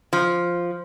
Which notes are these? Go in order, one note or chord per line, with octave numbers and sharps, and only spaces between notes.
F3